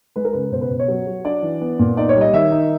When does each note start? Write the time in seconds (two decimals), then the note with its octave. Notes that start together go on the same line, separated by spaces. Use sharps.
0.16 G#3 B4
0.25 A#4
0.33 C#3 B4
0.52 B2 C5
0.61 B4
0.70 B2
0.79 C#5
0.88 F#3
1.07 F#3
1.25 D4 D5
1.43 E3
1.61 B3
1.79 A#2
1.97 D#4 D5
2.09 C#5
2.15 G3
2.21 D#5
2.33 D#3 E5
2.51 D#4